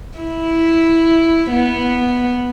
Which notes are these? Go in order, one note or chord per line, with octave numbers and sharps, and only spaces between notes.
E4
B3